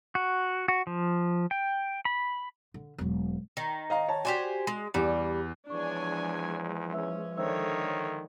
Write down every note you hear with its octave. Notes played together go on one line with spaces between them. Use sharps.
F#4
F#4
F3
G5
B5
D3
E1 F#3
D#3
D#5 F5 A#5
C#5 A5
F#4 G4 C5 D5 G#5
G#3
E2 G3
E2 F3 G#3 D4 C#5 G#5 C#6
C#4 B4 E5 E6
D3 D#3 C5 C#5 E5 E6